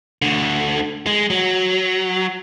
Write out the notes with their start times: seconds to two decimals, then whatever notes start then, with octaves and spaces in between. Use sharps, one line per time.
0.22 D2 D3
1.06 G#3
1.30 F#3